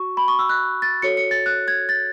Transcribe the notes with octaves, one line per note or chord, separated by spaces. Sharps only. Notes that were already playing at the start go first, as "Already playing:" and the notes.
Already playing: F#4 C#6
B5
C#6
E6
F#6
A6
F#4 A4 C#5 C#7
C#7
A6
F#6
G#6
A6